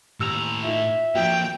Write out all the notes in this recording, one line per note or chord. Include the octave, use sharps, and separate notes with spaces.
D#2 A2 A#5 E6
D#4 F4 E5
F2 F3 F#3 A#3 G5